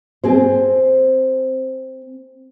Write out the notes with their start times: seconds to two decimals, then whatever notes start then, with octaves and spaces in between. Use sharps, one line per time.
0.24 C4 G#4 C5